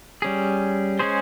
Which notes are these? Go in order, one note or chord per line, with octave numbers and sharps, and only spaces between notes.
G3 C#4 G#4
G#3 C#4 G#4 C5